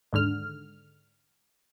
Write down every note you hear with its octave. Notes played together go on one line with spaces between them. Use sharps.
D#2 G#2 D3 F6